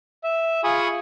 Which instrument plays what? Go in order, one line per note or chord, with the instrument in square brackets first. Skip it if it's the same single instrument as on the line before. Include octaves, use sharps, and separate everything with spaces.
[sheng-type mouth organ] E5
F4 G#4 G#5 B5 C#6 D#6